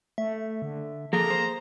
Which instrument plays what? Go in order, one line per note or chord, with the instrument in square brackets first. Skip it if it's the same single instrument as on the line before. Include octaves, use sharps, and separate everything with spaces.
[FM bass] A3 [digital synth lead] E5
[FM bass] D3
[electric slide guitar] F3 A4 [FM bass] A#3 [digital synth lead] G#4 [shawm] A#5
[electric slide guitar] C5